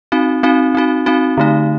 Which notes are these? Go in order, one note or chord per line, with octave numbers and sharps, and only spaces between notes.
C4 D#4 F#4
C4 D#4 F#4
C4 D#4 F#4
C4 D#4 F#4
D3 A3 D#4